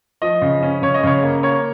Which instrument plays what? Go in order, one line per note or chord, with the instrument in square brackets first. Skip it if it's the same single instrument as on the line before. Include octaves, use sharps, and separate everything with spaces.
[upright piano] F3 D#5
C#3
C#4
C#3 C#5
D#5
C#3 C#5
A#3
A#3 C#5